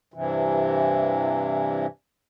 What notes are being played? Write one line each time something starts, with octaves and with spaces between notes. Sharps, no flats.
G2 C3 E3